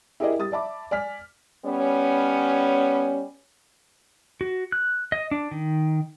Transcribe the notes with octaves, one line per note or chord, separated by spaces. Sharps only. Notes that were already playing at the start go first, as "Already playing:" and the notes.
E4 G4 G#4 A#4 D5 D#5
G3 D#6 A6
D5 E5 A5 B5 D6
D5 G#5 F6 B6
G3 B3 C#4
F#4
F#6
D#5
D4
D#3